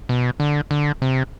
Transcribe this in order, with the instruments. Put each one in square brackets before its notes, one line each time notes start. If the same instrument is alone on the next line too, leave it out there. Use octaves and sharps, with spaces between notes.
[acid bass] B2
D3
D3
C3